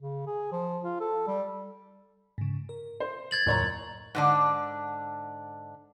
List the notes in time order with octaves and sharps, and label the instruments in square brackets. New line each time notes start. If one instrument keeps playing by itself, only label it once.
[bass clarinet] C#3
G#4
F3
F4
A4
G3
[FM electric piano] G#2 C#3
A#4
[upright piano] C5
[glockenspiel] G#6 A6 F#7
[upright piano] F#1 C#5 A#5 [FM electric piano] D#2 A2 C6
[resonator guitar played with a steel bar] G#2 D3 D4